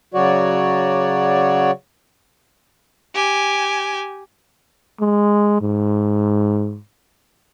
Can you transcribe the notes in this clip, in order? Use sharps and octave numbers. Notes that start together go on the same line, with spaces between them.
C#3 F#3 F#4 C#5 D5
G4 G#5
G#3
G#2